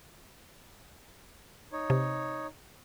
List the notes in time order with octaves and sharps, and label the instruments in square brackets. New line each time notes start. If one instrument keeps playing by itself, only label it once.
[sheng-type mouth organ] D#4 C#5
[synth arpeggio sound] C3